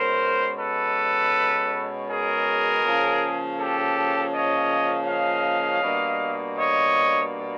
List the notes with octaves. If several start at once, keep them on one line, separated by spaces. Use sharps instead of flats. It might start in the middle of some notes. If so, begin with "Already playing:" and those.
Already playing: B2 G#3 C#4 A#4 C5
A4 B4
G#4 A#4
C#3 F3 A#3 C#4
G4 A4
C#5 D#5
D#5 F5
B2 G3 A#3 D4
C#5 D#5